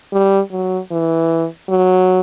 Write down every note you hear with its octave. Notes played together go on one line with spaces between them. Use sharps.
G3
F#3
E3
F#3